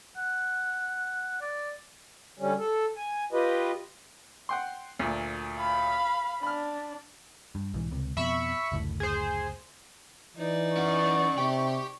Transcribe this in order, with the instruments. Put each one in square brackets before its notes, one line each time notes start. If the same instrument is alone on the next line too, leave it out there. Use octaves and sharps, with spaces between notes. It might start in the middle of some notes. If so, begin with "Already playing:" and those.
[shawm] F#5
D5
[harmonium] D3 G3 C#4
A4
G#5
F4 G4 B4 D#5
[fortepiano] F#5 G5 C6
D2 A#2
[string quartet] F5 B5
[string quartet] D4 [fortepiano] B5 F6
[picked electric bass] G2
B1 G#2 E3
C#2 C3
[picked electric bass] F2 B2 [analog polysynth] E5 B5 C#6
[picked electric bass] F#1 D2 A2
[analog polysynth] G#4 C5
[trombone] E3 [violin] D#4 D5
[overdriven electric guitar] C#4 F#5 [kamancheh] C#6
[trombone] C3 [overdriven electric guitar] G4 G5